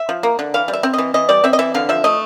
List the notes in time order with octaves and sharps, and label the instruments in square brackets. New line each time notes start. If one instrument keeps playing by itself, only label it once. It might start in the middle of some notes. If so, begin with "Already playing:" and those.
Already playing: [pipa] E5
F3
A#3
D3
E3 F5
G3
E5
C4
E3 D#5
E3 D#5
G3 D5
C4 E5
D#5
E3 E5
D3 F5
F3 E5
A3 D#5